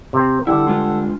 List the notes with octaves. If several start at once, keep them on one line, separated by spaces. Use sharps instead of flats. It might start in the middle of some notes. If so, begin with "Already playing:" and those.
C3 C4
D3 G3 E4 A4 F#5
G#3 D4 F4